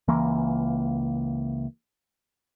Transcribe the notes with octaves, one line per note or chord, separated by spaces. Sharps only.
C#2 E3 A#3